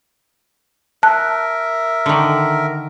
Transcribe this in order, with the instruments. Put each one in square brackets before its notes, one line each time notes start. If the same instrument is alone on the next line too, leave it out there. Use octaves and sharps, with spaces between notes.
[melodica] A#4 E5 [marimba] A5 F#6
[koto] D3 D#3